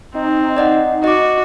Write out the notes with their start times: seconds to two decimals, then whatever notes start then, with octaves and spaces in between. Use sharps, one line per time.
0.15 C4 D#4
0.57 D5 D#5 F#5
1.04 F#4 D#5 D6